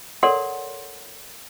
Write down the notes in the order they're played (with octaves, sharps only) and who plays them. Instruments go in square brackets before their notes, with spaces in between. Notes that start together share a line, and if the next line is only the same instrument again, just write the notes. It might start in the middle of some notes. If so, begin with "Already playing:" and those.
[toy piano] A4 A#4 C#5 D5 F#5 C6